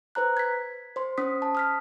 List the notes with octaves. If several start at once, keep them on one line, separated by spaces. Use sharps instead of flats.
B4 C5 A#5 F#6
G#6 B6
C5 C6
C#4 C5 D#6 B6
A5
D#6 F6 B6